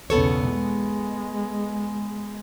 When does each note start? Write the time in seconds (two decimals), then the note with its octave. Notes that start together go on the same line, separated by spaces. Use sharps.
0.10 B1 E2 C#3 B3 A4 C#5
0.49 G#3